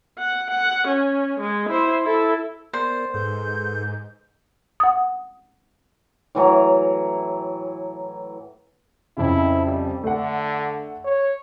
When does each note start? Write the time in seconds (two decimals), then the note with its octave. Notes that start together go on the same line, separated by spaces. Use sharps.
0.19 F#5
0.51 F#5
0.88 C#4
1.40 G#3
1.70 E4 C5
2.04 E4 A4
2.73 B3 A#4 C5 D5
3.14 G#2 G#4 A4 B4 G6
4.80 F#5 D#6
6.35 A2 E3 F#3 A#5
9.17 F2 C#3 E4
9.65 G3
10.03 D3 A3 A4 F#5
11.05 C#5